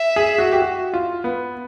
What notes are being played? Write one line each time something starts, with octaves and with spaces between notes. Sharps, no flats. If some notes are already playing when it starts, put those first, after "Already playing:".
Already playing: E5
G#4
F#4
G4
F#4
F4
B3